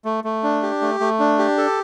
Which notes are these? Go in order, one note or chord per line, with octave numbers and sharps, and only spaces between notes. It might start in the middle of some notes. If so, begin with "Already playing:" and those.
A3
A3
D4
G4
A3
A3
D4
G4
A4